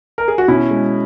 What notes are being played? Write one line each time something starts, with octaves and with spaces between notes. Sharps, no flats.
A#4
G#4
F#4
B2 C#4 E4
G#3